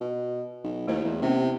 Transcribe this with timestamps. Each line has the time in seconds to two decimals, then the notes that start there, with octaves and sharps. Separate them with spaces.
0.01 B2
0.64 B1
0.88 D#2 A3 E4 C5
1.04 E2
1.22 C3 B3 C#4 G4